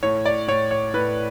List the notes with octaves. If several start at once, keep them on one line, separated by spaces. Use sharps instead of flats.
A2 C#5
D5
A2 C#5
C#5
A2 B4